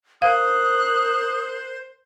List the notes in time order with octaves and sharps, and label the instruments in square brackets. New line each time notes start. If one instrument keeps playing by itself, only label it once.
[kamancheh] A#4 F#6 [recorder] C5 [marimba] F5 [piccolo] D#6